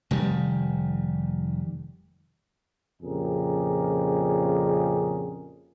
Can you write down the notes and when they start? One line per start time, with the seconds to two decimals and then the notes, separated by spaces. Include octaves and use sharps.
0.11 F1 D#3 G3
3.02 F2 A#2 C#3 G4 G#4 A#4